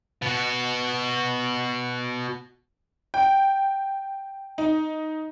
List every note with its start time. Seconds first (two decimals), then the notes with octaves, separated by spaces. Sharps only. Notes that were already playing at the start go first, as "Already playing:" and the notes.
0.22 B2 F#4
3.14 G5
4.58 D#4